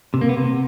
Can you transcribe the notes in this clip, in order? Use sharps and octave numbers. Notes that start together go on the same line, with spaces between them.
C3
A#3
B3
C3